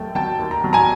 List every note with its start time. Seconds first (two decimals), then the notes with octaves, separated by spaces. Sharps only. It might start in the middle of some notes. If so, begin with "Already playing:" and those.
Already playing: D#2 F#3 A3 G5 A5
0.15 F#3 G5 A5
0.39 D#2
0.51 A#5
0.64 F#3
0.73 G#5 A#5